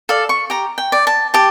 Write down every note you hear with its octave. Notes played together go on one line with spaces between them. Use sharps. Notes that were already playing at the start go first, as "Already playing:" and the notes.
A4 D5 F5
C#6
G4 A#5
G5
D5
A5
G4 A5